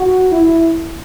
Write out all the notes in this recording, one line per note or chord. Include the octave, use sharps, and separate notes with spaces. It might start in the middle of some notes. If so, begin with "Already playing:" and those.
Already playing: F#4
E4